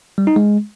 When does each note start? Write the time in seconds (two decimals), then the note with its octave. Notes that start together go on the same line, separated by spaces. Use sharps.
0.18 G3
0.27 D#4
0.36 G#3